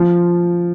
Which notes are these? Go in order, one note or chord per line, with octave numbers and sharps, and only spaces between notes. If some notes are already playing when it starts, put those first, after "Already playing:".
Already playing: F3